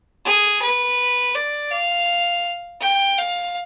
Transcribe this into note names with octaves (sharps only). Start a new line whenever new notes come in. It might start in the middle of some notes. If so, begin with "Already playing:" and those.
G#4
B4
D5
F5
G5
F5